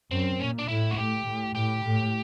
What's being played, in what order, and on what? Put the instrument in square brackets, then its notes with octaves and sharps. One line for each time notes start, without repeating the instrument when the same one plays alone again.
[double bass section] F#2 [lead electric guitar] C4
[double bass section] A#2 [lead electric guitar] C#4
[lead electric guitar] D4
[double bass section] A2 [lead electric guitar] E4
[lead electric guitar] F#4
[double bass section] A2 [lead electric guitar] G4
[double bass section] A2
[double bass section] A2 [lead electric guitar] G4
[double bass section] A2